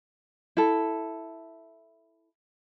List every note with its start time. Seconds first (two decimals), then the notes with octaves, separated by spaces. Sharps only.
0.57 E4 A4